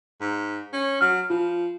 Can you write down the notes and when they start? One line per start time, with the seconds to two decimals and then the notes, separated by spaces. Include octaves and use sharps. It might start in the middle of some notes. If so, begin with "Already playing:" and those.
0.21 G#2
0.73 C#4
1.01 F#3 F6
1.30 F3 F4